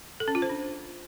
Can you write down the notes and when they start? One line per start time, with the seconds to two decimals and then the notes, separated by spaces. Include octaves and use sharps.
0.20 A4
0.28 C#4
0.35 F4
0.42 C5
0.50 D4